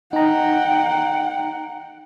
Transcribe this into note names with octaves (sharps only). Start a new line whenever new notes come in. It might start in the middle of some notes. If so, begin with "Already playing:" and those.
D#4 F#5 G5 A#5